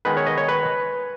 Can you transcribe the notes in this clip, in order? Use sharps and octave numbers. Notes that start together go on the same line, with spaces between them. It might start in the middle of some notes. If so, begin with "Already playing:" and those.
D#3 G#3 B3 D#4 B4
C#5
D#5
C#5
B4